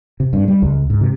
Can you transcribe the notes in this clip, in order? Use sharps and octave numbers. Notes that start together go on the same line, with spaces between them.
C3
G2
G3
C#2
G#2
C3